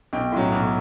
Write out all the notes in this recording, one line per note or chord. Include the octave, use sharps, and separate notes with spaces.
B1 G5
A2 F#3
B1